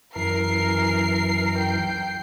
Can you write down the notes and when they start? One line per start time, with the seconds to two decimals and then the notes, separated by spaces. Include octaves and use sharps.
0.16 F#2 E3 A#4 C7
1.58 G5